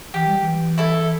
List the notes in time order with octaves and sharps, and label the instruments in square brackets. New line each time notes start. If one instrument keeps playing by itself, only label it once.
[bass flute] E3 [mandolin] G4
[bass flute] G3
E3
[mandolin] E4 A4